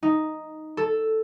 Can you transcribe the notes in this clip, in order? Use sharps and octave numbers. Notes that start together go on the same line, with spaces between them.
D#4
A4